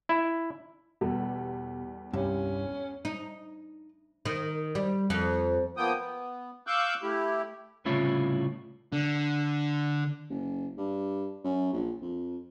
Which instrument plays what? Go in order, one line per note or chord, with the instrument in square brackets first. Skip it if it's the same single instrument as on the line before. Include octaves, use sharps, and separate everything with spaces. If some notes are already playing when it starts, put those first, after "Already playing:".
[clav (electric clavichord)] E4
[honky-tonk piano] E2 G3 A4 [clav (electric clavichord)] B2
[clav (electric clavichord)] C2 G4 [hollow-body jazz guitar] G2 [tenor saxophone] C#4
[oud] D#4
D#3
G3
F2
[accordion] F3 A#3 B3 G5 D#6
B3
F5 C#6 D6 E6 F#6 G6
A3 E4 G4
[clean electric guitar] C2 A2 C#3 E4 F4 C#5
[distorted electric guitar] D3
[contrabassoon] F#1
G2
F#2
A#1
F2